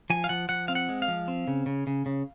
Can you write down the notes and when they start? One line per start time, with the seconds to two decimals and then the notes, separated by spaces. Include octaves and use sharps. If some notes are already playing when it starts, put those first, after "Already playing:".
0.10 F3 G#5
0.24 F5
0.29 F3 F#5
0.49 F3 F#5
0.68 C4 F5
0.75 F#5
0.89 G#3
1.02 F5
1.08 F3
1.28 C4
1.48 C#3
1.66 C#3
1.87 C#3
2.06 C#3